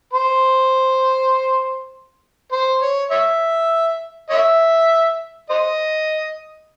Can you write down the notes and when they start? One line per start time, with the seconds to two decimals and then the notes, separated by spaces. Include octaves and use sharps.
0.13 C5
2.52 C5
2.82 C#5
3.11 C#5 E5
4.30 C#5 E5
5.50 C5 D#5